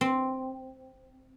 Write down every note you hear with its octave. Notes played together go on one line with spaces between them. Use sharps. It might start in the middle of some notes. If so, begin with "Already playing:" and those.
C4